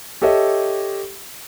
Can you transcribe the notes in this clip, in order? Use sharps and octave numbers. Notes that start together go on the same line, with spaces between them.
G4 A4 C#5 D#5 E5